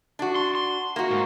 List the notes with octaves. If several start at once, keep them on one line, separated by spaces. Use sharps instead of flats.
D4 F#4
C6
C6
A#3 F#4
G#2